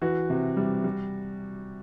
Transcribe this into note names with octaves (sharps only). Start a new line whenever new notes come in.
E3 F#4
C3
G3
G3